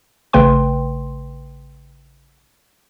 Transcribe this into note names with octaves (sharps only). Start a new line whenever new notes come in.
A1 C#3 A3 B4 G5 C6